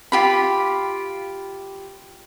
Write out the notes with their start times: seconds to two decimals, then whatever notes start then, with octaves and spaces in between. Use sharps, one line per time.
0.12 F4 G4 B5